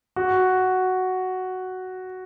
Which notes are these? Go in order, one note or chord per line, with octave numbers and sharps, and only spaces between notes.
F#4